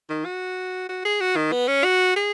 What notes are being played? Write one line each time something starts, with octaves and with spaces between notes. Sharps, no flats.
D#3
F#4
F#4
G#4
F#4
D#3
B3
C#4
F#4
G#4